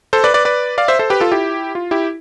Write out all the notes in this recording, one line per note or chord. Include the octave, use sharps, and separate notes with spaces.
A4 C5
B4 D5
B4 D5
B4 D5
D5 F5
C5 E5
A4 C5
G4 B4
F4 A4
E4 G4
F4
E4 G4